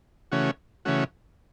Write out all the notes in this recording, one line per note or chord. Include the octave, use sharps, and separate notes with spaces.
C#3 E3 A3 C#4 F#4
C#3 E3 A3 C#4 F#4